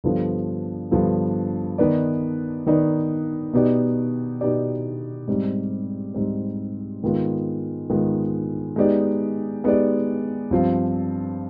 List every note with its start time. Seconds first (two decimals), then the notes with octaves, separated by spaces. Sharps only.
0.04 G2 D3 F3 B3
0.91 G2 D3 F3 B3
1.78 D#3 B3 D#4 B4 D5
2.66 D#3 B3 D#4 B4 D5
3.53 B2 B3 D#4 G4 D5
4.41 B2 B3 D#4 G4 D5
5.28 G#2 G3 C4
6.14 G#2 G3 C4
7.03 G#2 D#3 G#3 B3 F4
7.90 G#2 D#3 G#3 B3 F4
8.76 G#3 B3 D#4 G4 D5
9.64 G#3 B3 D#4 G4 D5
10.51 G2 F3 C4 F4